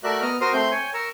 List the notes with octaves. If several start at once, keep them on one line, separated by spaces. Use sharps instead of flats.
A3 F#4 A#4 D5 E5 F#6
B3 D#5 A#5 F6
F#4 A#4 C5 C6 D#6 F6
A3 C4 G5 C6 G6
C#5 G5 G#5
A#4 A#5 C#6 E6